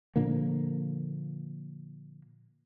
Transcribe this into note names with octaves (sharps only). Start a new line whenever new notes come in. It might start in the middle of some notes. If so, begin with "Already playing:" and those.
A#2 D3 F3 A#3